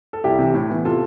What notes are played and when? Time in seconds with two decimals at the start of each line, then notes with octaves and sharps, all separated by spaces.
0.13 A4
0.24 C2 E4 G4
0.39 C3 E3
0.54 A2
0.70 E3 B3
0.85 C3 F4 A4